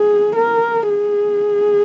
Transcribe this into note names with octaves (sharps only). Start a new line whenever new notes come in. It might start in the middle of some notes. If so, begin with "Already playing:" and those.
Already playing: G#4
A#4
G#4